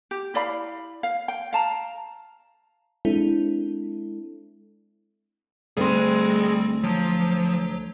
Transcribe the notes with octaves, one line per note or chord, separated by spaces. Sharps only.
G4
E4 D5 F5 B5
F5
G5
F5 A5 A#5
G#3 C4 D4 E4 A4
D2 G3 A3 C4 G#4 C6
F3 F#3